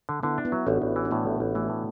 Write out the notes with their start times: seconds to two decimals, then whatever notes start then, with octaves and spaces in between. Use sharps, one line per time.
0.09 D3
0.23 D3 B3 E4
0.38 D4
0.45 B3 E4
0.52 F#3
0.66 A1 D4 F#4
0.82 A1
0.96 E3
1.05 D4
1.11 A2 B3 E4
1.25 A1
1.40 A1
1.55 E3 A3
1.69 A2